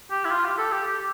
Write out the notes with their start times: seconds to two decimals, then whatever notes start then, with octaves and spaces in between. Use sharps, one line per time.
0.11 G4
0.25 E4
0.32 F4
0.45 G4
0.58 A4
0.72 G4
0.87 G4